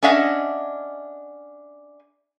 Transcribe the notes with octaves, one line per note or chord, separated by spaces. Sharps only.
C#4 D4 G#4 D#5 E5 F#5